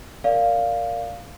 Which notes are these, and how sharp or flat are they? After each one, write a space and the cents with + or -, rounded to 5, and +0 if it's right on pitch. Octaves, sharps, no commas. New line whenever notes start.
A#4 -10 D5 -15 F5 +0